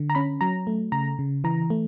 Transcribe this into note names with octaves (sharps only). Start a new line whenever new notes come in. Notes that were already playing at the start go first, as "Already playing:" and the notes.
Already playing: D3
A#5
C#4 B5
F#3 A#5
A3
C#3 A#5
C#3
E3 A#5
A3